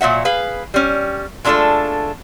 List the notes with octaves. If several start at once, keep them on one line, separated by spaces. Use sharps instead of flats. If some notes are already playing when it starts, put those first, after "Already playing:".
A#2 F#3 E5 F#5
G#4 B4 F5
G3 C#4
G#3 A3 D4 E4 F4 A4